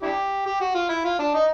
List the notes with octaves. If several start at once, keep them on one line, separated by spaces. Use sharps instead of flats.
D4 E4 G4
G4
F#4
F4
E4
F4
D4
D#4